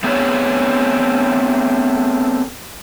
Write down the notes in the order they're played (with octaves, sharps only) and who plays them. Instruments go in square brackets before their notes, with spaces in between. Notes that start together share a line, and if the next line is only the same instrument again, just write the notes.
[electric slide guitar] A3 B3 C4 D4 G#4 C#5